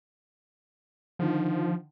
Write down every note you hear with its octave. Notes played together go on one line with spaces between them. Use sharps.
D3 D#3 F3